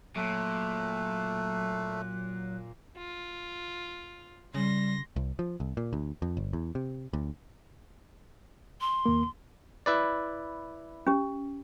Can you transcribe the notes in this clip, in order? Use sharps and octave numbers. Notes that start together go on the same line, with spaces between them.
A#2 F#3 A3 F#6
F4
C#3 G3 C6 A#6
C2
F3
C2
A#2
D2
F2
G1
E2
C3
D2
C6
D#2 A#3
E4 B4 D5
C#4 G4